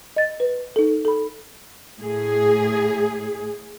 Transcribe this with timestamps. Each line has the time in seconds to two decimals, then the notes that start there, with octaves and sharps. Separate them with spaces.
0.16 D#5 A6
0.40 B4
0.76 D#4 A4
1.05 A4 B5
1.99 A2 G#4